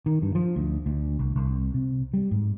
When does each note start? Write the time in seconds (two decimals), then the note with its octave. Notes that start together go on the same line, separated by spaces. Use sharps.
0.06 D#3
0.22 G2
0.35 F3
0.56 D2
0.86 D2
1.19 C2
1.36 C2
1.74 C3
2.14 G3
2.31 G#2